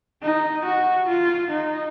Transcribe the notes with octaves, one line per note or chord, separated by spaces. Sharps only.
D#4
F#4
F4
D#4